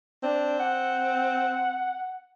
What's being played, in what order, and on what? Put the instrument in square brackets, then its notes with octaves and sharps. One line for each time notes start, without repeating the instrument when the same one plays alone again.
[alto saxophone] C4 [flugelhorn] D4
[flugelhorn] F#5